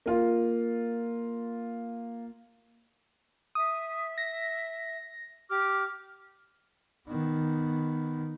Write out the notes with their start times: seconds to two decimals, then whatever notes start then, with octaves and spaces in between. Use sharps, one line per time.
0.06 A#3 F4
3.55 E5 D#6
4.18 A#6
5.50 G4 D6 F6
7.09 D#3 B3